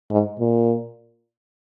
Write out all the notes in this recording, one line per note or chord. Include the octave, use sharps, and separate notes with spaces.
G#2
A#2